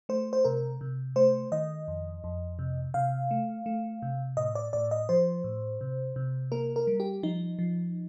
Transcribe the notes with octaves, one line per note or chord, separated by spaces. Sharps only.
A3 C5
C5
C3 A#4
C3
A3 C5
D#3 D#5
F2
F2
C3
C3 F5
A3
A3
C3
A2 D#5
D5
A2 D5
D#5
F3 C5
A2
C3
C3
A#3 A#4
A#4
G3
G4
F3 D#4
F3